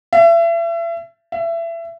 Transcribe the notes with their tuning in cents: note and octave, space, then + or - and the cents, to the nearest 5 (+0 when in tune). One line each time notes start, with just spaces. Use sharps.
E5 +35
E5 +25